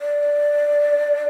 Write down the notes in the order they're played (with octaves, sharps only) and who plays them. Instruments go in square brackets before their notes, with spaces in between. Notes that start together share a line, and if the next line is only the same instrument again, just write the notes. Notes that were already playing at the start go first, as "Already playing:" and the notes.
[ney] D5